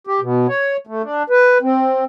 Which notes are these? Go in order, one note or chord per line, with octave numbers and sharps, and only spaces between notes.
G4
B2
C#5
A3
D4
B4
C4